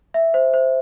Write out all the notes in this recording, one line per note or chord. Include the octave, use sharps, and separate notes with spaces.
E5
C5
C5